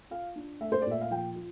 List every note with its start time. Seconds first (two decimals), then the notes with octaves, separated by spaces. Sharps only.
0.10 F4 F5
0.36 D4
0.61 A3 E5
0.72 C5
0.82 A#2 D5
0.91 E5
1.01 F5
1.11 F3 G5
1.36 F4